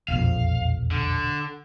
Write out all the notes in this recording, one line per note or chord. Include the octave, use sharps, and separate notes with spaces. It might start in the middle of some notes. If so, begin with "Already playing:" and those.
E1 A#1 F2 F5
D3